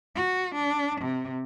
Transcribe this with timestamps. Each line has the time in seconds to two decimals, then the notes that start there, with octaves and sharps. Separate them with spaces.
0.15 F#4
0.55 D4
1.01 C3